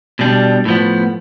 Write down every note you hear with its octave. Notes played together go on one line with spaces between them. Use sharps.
B2 G3 D4
A2 F3 B3